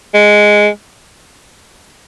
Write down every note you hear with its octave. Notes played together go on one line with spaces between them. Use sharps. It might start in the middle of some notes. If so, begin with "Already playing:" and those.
G#3